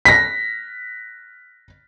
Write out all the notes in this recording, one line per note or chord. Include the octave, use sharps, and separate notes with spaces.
A#6 B6